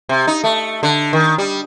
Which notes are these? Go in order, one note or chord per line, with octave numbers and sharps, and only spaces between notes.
C3
D#4
A3
D3
D#3
G3